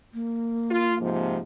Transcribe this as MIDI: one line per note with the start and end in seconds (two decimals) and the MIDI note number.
0.14 1.37 58
0.70 0.95 65
1.00 1.38 44
1.00 1.38 48
1.00 1.38 53